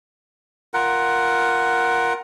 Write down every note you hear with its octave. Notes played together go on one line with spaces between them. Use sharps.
F4 A#4 F#5